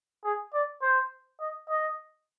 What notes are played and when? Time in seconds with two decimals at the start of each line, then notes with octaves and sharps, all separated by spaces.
0.24 G#4
0.54 D5
0.82 C5
1.41 D#5
1.70 D#5